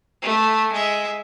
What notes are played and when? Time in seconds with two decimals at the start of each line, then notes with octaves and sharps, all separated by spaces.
0.22 A3
0.73 G#3 E5